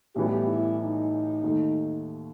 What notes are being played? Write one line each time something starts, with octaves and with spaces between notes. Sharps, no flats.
B1 A2 E3 G3 B3 G4
E4
D#4
D#2 D#3 A3